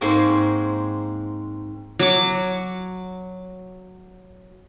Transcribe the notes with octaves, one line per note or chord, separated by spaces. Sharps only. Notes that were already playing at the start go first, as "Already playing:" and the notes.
G#2 G#3 A#3 C4 F#4
F#3 D6